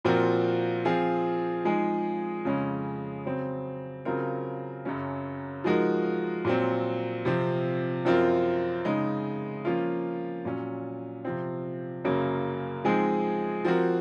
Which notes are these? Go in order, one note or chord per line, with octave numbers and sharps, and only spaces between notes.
A#2 F3 C4 F#4 A#4
F3 C4 F4 G#4
F3 G#3 D#4 G#4
F2 C#3 G#3 C#4
C#3 F#3 C4
C#3 F#3 C4 F4 A#4
F#2 C#3 F#3 C#4
F3 G#3 D#4 F#4 A#4
A#2 F#3 C4
C3 F3 C4
F#2 F3 C4 F4 A#4
C#3 G#3 D#4
F3 A#3 C#4 F4
A#2 F#3 C#4
C3 F3 C4
F#2 C#3 F#3 A#3 C#4
F3 G#3 C4 D#4 G#4
F3 C4 F#4 A#4